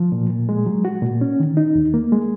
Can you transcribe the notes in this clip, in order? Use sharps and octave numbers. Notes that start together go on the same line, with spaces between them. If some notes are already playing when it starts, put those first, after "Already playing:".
Already playing: F3
A#2
A#2
G#3
F#3
F#4
A#2
C#4
D#3
D#4
D#2
A#3
G#3